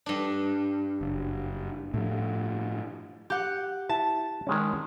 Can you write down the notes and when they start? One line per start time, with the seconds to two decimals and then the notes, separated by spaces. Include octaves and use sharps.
0.06 G2 D4
1.01 F#1
1.94 A2 F3
3.30 G4 F#5
3.89 E4 A5
4.47 D#3 G#3 C#4